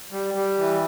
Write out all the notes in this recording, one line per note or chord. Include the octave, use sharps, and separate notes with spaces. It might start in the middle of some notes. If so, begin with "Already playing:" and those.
G3
G3
E3